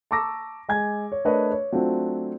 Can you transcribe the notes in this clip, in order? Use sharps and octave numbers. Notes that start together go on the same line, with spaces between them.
A5 A#5 C#6 D6 E6 A#6
G#3 G#5 G#6
C#5
A3 D4 A#4 B4 C#5 D#5
C#5
F#3 A3 C4 D4 F4